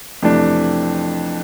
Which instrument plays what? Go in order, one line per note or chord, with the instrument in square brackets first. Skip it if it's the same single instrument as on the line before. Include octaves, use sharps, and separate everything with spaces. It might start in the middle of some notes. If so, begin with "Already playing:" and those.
[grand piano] F2 C3 E3 A3 D4